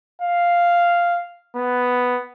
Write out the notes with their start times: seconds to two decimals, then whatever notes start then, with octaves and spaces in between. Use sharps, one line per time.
0.22 F5
1.56 B3